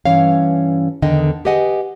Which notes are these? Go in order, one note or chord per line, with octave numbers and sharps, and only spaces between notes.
G2 E3 C#4 C#5 F5
E2 D3 D#3 D#5 G5
G4 G#4 B4 D#5 F#5 G#5